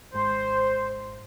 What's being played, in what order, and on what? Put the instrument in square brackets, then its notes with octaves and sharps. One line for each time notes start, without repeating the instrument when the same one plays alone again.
[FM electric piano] G#1 G#2 [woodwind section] C5